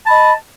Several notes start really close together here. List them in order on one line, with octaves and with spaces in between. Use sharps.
A5 B5 D#5